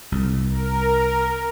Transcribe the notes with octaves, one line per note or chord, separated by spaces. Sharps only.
C2
A#4